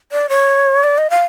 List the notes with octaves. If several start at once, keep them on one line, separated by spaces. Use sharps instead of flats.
D5
C#5
D5
D#5
F5